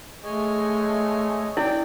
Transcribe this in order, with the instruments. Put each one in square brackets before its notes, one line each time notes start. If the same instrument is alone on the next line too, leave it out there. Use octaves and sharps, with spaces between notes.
[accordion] G#3 [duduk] A3 [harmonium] C#5 D#5 G#5
[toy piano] E4 [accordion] D5 G5